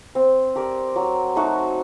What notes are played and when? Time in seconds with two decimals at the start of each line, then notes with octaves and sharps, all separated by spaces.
0.15 C4
0.55 G4 A#4 D5
0.96 F#3
1.36 A3 D#4 F#4